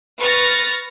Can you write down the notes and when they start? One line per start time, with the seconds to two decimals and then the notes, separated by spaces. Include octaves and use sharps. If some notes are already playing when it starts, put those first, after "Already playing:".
0.20 B4 C#6 F6 A6 A#6